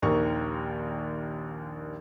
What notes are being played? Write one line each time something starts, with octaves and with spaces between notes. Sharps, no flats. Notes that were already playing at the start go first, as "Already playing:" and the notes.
A#1 D#2 D#3 A#4 C#6